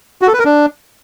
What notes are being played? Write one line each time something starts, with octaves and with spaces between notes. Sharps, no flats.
F#4
A4
B4
A#4
D4